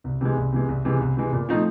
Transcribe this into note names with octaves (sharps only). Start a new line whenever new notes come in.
C2
C3 E3 G#3
C2
C3 E3 G#3
C2
C3 E3 G#3
C2
C3 E3 G#3
A#2
F3 A3 C4 D#4